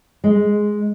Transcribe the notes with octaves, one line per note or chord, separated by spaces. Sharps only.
G#3